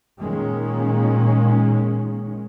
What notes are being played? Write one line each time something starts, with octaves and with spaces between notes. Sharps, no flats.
A#2 D#3 G#3 A#3 C#4